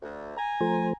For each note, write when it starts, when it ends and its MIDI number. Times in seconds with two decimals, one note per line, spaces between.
0.02 0.37 38
0.37 0.94 80
0.37 0.94 82
0.61 0.93 53
0.61 0.93 57
0.61 0.93 72